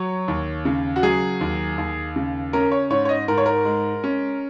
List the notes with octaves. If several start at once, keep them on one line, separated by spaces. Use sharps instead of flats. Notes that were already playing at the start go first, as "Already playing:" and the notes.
Already playing: F#3 C#5
D#2
C#3
F#4
F#3 G#4
D#2
D#2
C#3
C#4 A#4
C#5
G#2 C#5
C#5
D#5
G#2 A#4
C#5
A#4
G#3
C#4